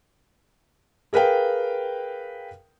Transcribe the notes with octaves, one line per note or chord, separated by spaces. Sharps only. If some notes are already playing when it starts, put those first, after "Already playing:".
G#4 A#4 B4 F5 G5